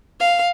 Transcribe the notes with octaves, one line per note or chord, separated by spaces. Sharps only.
F5